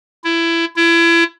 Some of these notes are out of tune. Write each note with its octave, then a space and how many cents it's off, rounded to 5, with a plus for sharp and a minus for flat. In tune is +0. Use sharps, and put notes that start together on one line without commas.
E4 +20
E4 +30